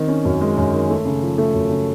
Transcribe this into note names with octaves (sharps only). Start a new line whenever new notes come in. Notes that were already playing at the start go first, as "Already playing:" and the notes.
Already playing: D#3 C4
C#4
F#2
G#3
F#2
D#3
A3
C#3
F3
A3
F#2
C#3